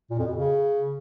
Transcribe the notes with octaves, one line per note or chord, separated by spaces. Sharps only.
A#2
F2
B2
C#3